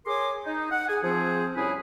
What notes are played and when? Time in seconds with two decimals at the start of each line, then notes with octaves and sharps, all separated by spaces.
0.06 G#4 A#4 C#5 G#5 C6 D6
0.45 D#4
0.71 F#5
0.88 G#4 G#5
1.03 F3 C4 G#4
1.55 C2 C#4 E4 G#4 B4 C#5